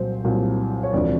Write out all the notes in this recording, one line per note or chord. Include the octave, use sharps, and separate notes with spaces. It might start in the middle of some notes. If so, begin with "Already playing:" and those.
Already playing: C2 A#2 F#3 C5
C2 A#2 F#3
C#5
E1 D2 C3 F3 D5